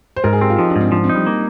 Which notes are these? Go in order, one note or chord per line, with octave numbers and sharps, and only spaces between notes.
C5
G#2 A#4
G#4
C4 G4
F4
F3 D#4
D4
G#2 C4
F3 D4
C4
D#4
G3
A#3